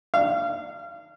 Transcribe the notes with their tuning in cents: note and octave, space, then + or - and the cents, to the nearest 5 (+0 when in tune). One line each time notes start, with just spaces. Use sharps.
F5 -30